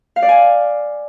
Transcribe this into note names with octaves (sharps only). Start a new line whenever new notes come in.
F5
D5
G#5